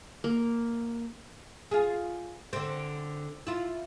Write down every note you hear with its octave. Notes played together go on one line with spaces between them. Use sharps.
A#3
F4 G#4
D3 C4
E4 F4